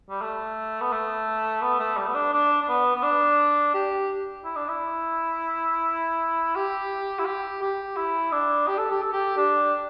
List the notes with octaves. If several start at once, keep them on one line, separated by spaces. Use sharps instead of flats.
G3
A3
B3
A3
B3
A3
G3
B3
D4
D4
D4
B3
B3
D4
G4
E4
D4
E4
G4
E4
G4
G4
E4
D4
G4
A4
G4
A4
G4
D4